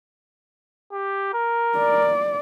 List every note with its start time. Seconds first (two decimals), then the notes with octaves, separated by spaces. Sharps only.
0.92 G4
1.33 A#4
1.78 D5